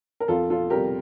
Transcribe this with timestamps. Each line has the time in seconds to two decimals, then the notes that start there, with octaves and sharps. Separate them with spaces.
0.20 A#4
0.28 F2 F4 A4
0.50 F4 A4
0.70 C3 G3 G4 A#4